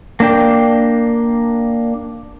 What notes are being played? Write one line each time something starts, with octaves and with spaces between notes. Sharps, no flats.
A#3 D4 G5